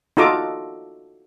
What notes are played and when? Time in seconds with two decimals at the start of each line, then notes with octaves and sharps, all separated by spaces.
0.17 D#4 F4 F#4 A4 A#5 D6